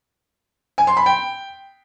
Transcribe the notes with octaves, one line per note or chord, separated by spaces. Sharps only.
G#5
C6
B5
G5